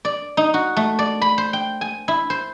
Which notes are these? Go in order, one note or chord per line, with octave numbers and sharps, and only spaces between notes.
D5
D#4
F#4
A3
D5
B5
C5
G5
G#5
E4
C5